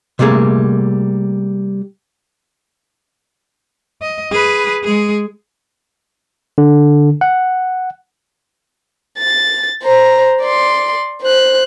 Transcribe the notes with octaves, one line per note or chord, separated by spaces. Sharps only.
C3 G3 A3 A#3 G#4
D#5
G#4 B4
G#3 G#4
D3
F#5
A6
C5 A#5
D5 C6
C5 F#6